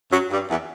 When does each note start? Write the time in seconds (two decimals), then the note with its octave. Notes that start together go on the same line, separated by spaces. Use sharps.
0.11 F#2 F#3
0.30 G2 G3
0.49 E2 E3